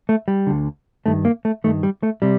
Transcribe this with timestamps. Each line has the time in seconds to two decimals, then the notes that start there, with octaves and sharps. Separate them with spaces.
0.09 A3
0.28 G3
0.47 D2 D3
1.06 G2 D#3 A3
1.25 A#3
1.45 A3
1.64 G2 D#3 A3
1.83 G3
2.03 A3
2.22 C3 G3